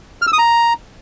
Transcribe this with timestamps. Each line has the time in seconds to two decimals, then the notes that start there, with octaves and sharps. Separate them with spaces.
0.22 F6
0.27 E6
0.33 D#6
0.38 A#5